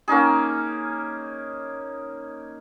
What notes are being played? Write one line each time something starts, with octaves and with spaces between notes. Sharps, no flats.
A#3 C#4 D#4 G#4